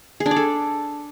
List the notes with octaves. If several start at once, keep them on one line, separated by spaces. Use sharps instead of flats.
G#4
D4
D5
A4